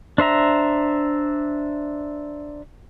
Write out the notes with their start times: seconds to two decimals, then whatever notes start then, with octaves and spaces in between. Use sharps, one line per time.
0.18 D4 C5 E5 A#5